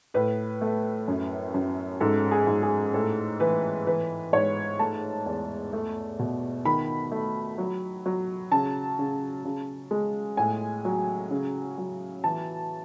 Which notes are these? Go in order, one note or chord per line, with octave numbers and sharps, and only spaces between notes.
A2 B4
A3
F#2
F#2
G#2 A4
G#4
G#2
G#4
A2 A4
E3 B4
E3 B4
G#2 C#5
A3 A5
E2
A3
B2
D#3 B5
A3
F#3
F#3
C#3 A5
C#3
C#3
G#3
A2 G#5
F#3
C#3
F#3
E3 A5